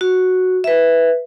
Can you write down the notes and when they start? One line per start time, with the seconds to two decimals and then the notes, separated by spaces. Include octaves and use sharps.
0.01 F#4
0.64 B4 E5